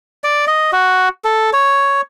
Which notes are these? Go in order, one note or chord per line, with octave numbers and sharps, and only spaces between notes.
D5
D#5
F#4
A4
C#5